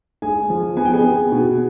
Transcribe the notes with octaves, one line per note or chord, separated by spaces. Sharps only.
G#3 G#4 G#5
F3
B3 G#5
G5
G#4 G#5
B3
B2